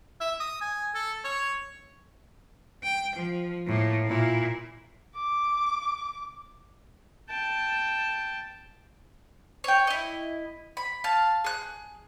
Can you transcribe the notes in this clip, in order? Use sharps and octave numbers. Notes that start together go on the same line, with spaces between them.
E5
D#6
G#5
A4
C#5
G5
F3
A2 A#3
A#2 E4
D6
G5 A5
C#5 G5
E4 D#5
B5
F5 A5
G#4 F#6